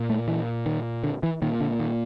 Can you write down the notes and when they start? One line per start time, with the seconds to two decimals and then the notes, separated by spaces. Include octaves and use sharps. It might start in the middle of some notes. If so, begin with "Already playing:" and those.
Already playing: A#2
0.10 A3
0.28 E3
0.66 D#3
1.04 D3
1.23 E3
1.42 A#2 D#3
1.60 D3
1.80 D#3